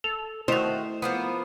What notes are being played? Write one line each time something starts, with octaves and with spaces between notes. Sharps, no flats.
A4 F7
D#3 A3 E4 F#4 C5 F7
F3 A#3 B3